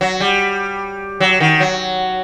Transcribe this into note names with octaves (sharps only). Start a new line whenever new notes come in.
F#3
G3
F#3
D#3
F#3